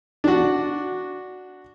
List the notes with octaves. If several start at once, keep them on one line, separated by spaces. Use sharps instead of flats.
D4 F#4